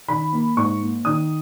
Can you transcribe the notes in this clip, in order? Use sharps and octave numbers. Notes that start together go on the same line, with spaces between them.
D#3 B5
A#3
G#2 C#6
A#3
D#3 D#6